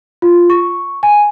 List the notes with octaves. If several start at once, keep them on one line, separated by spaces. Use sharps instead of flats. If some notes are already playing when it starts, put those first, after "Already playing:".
F4
C#6
G#5